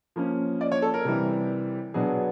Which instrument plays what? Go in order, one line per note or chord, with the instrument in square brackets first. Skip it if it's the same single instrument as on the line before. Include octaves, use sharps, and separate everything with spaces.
[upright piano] F3 A#3 C#4
D5
C#5
A4
A#4
C3 E3 G3
B2 F#3 B3 D4 G#4